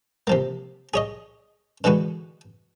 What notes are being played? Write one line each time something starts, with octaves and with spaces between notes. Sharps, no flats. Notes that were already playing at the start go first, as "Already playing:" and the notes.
C3 F3 A#3
G#4 C#5 D#5
D3 E3 G#3 F#4 B4